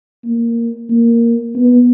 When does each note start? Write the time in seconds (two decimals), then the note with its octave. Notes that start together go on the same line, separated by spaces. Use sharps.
0.24 A#3
0.90 A#3
1.55 B3